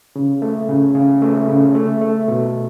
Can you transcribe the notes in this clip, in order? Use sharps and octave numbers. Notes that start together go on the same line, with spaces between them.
C#3
A3
C#3
C#3
A3
C#3
A3
A3
B2